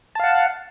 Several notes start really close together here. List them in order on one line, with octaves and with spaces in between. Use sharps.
A5 F5 F#5